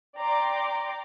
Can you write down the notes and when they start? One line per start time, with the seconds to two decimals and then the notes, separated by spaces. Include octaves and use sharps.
0.17 D5 G5 A#5 C6 D6